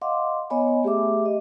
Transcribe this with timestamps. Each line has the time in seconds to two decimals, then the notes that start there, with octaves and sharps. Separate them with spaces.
0.02 D#5 F5 F#5 C6 D6
0.50 B3 C#5 D#5 G#5 B5
0.83 A3 G4 G#4 E5 D6
1.25 D#5